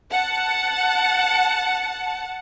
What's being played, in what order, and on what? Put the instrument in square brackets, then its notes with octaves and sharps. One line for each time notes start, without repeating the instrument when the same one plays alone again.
[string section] F#5 A5